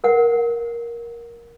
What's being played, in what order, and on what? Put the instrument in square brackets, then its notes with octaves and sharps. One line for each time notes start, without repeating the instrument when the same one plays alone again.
[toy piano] A#4 F#5